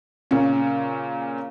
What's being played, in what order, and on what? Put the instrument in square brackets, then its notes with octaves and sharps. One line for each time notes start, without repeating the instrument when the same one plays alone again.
[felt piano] A#2 C#3 C#4